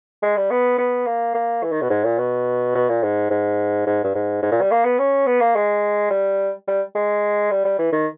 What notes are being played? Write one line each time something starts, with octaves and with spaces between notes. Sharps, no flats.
G#3
G3
B3
B3
A#3
A#3
E3
D#3
B2
G#2
A#2
B2
B2
A#2
G#2
G#2
G#2
G2
G#2
G#2
A#2
G3
A#3
B3
C#4
B3
A#3
G#3
G3
G3
G#3
G3
G3
E3
D#3